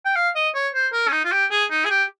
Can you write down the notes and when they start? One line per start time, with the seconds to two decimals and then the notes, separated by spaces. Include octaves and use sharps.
0.05 G5
0.16 F5
0.35 D#5
0.55 C#5
0.74 C5
0.93 A#4
1.08 C#4
1.12 D#4
1.25 F4
1.32 G4
1.51 G#4
1.71 D#4
1.85 G#4
1.90 G4